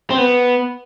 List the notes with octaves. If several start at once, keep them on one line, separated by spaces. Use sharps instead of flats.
C4
B3